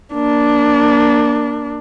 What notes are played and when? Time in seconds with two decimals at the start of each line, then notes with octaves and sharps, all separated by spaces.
0.14 A#3 D4